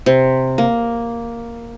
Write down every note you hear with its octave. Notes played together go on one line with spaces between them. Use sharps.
C3
A#3